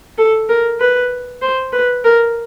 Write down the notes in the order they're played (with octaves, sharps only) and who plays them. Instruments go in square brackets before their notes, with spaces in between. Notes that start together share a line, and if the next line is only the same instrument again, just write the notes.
[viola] A4
A#4
B4
C5
B4
A#4